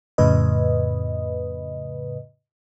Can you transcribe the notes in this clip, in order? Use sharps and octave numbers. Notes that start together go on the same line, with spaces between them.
F2 A2 C#3 B4 D#5